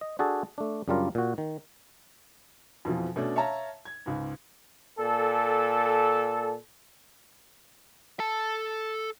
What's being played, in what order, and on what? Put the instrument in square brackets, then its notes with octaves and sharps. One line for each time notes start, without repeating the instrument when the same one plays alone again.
[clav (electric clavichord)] D#5
D4 F#4 G#4 A4 A5
A3 D4
F#2 C#3 G3 D4 F4 A#4
A#2 F#4
D#3
[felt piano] F2 B2 E3 F3
B2 A3 C#4 D4
C#5 E5 F5 A5 A#5
G#6
C#2 G#2
[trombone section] A#2 A4
[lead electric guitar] A4 A5